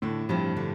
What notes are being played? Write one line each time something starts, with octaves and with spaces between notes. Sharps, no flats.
A2 D3
G2 F3 C4 F4
D3